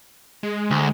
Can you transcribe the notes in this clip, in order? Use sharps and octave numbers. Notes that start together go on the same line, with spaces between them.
G#3
D2